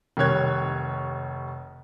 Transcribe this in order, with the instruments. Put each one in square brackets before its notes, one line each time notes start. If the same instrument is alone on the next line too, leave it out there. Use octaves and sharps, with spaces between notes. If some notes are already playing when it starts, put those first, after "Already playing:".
[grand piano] F1 D#3 G3 C#5 F#6 G#6